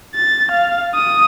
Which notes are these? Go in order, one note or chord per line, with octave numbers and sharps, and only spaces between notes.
A6
F5
D#6